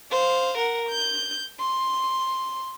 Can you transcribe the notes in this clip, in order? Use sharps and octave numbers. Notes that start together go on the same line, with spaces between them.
C5 F5
A#4 F#5
G6
C6